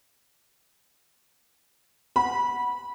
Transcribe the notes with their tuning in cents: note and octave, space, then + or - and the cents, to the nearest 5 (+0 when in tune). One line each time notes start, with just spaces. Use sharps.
F#5 +0 B5 -20